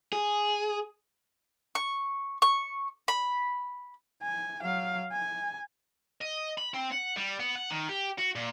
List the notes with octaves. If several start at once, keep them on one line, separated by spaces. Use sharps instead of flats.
G#4
C#6
C#6
B5
G#5
F#3 F5
G#5
D#5
B5
C4
F#5
G3
B3
F#5
D#3
G4
F#4
A#2